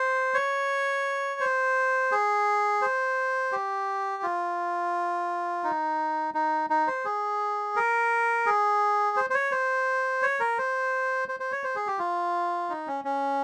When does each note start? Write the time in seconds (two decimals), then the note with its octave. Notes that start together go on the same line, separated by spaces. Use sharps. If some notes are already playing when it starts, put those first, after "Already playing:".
Already playing: C5
0.34 C#5
1.40 C5
2.12 G#4
2.82 C5
3.52 G4
4.23 F4
5.64 D#4
6.34 D#4
6.70 D#4
6.87 C5
7.05 G#4
7.76 A#4
8.46 G#4
9.17 C5
9.30 C5
9.34 C#5
9.52 C5
10.22 C#5
10.40 A#4
10.58 C5
11.28 C5
11.40 C5
11.52 C#5
11.64 C5
11.76 G#4
11.87 G4
11.99 F4
12.70 D#4
12.88 C#4
13.05 C#4